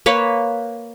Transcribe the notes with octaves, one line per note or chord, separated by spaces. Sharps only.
A#3 B4 C#5